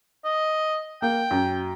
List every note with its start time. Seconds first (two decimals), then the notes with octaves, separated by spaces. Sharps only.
0.25 D#5
1.02 A#3 G5
1.31 F#2